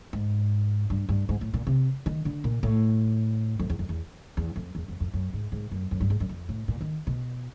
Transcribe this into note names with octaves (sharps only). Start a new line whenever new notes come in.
G#2
G2
G2
G#2
A2
A#2
C3
D#3
D3
A#2
A2
F2
E2
F2
E2
E2
F2
E2
F2
F2
F#2
G#2
G#2
F#2
F#2
G2
G#2
F#2
F2
A2
A#2
D#3
B2